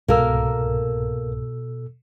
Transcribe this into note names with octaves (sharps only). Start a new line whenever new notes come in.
C2 G#2 B2 A#3 A4 A#4 E6